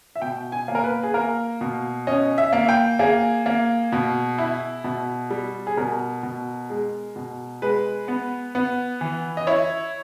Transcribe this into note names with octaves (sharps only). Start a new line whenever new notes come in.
E5
B2 G5
G#5
A#3
A#4
B4
G#4
A#3 A#4
B2
C#4 D#5
E5
A#3
G5
A#3 G#4
A#3
B2
E4
B2
G3
G#4
B2 A#4
B2
G#3
B2
G#3 B4
B3
B3
E3
D#5
E4 C#5